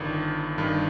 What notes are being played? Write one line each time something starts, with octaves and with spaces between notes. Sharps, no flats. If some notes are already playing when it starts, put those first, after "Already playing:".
Already playing: G1 G2 D#3
G1 G2 D#3